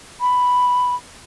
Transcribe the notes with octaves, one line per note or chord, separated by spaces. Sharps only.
B5